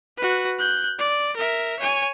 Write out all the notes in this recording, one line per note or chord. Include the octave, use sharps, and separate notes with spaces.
F#4 B4
F#6 G6
D5
A#4 E5
C#5 G#5